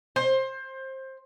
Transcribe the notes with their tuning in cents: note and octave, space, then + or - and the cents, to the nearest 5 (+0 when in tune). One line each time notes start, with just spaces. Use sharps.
C5 +20